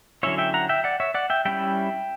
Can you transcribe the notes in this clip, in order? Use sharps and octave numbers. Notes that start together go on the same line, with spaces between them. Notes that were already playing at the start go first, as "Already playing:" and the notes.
D3 F#3 C#4 E4 C#5 E5
E5 G5
F#5 A#5
E5 G5
D5 F#5
C#5 E5
D5 F#5
E5 G5
G3 C#4 E4 E5 G5